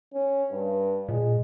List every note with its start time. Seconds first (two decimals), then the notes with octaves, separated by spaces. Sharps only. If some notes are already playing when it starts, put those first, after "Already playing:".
0.13 C#4
0.51 G2
1.08 A#2 G#3